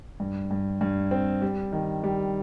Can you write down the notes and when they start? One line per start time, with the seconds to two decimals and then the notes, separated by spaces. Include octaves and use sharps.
0.20 G2
0.51 G2
0.81 G2
1.11 C4
1.42 G3
1.72 D#3
2.04 G3